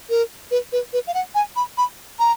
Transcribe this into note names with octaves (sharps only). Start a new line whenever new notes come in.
A#4
B4
B4
B4
F5
F#5
G#5
B5
B5
A#5